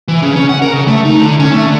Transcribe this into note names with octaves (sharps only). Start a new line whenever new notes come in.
E3
C#3
C#4
F#5
A#4
C#3
A3
D#4
D3
C#4
A3
D3